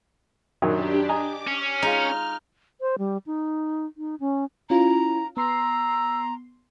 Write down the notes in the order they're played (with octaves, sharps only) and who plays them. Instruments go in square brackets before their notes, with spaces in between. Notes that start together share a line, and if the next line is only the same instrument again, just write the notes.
[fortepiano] F#2 D#3 F#3 [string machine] D4 G4
[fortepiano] D#5 G#5 A#5 [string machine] D6
[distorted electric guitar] C#4 [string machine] F6
[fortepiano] G#3 F4 [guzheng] D#4
[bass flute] C5
G3
D#4
D#4
C#4
[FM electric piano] C#4 F4 [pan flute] E4 [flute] A#5
[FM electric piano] B3 C6 C7 [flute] A#5 [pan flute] E6